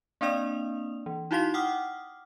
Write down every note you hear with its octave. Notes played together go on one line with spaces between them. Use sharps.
A#3 C4 D4 D5 D#6 F7
E3
D#4 E4 F#4 F5 C6 B6
F#5 G5 D6 D#6 F6